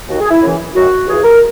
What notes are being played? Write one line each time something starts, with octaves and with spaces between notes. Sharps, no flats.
D#2 D#3 F#4
G#4
E4
F#2 C#3 E3
F#2 D#3 F#4
C#2 C#3 E3 G#4
A#4